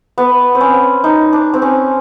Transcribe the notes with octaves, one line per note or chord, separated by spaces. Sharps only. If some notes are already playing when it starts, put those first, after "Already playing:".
B3
C4
C#4
D#4
D4
C4
C#4